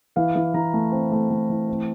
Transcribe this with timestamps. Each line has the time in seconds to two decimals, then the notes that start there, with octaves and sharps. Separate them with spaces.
0.16 E3 F5
0.35 E3
0.54 E3 A#5
0.74 A3
0.92 C4
1.12 A3
1.30 A3
1.50 E3
1.69 C4